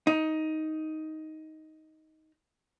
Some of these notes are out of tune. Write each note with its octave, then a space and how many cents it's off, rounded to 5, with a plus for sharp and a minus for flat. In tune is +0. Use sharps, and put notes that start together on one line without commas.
D#4 +10